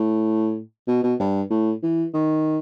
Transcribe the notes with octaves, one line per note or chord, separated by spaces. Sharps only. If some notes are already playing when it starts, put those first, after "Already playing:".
Already playing: A2
B2
B2
G2
A2
E3
D#3